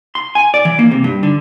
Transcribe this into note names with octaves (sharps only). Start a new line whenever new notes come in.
C6
G#5
D5
E3
A#3
C3
G2
D3